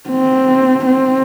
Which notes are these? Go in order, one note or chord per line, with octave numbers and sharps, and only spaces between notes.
C4
C4